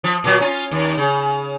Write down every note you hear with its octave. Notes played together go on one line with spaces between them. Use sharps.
F3
A#2 F#3
C#4 F4
D#2
C#3